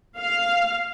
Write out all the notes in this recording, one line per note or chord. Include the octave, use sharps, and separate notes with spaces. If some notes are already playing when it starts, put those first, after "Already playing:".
F5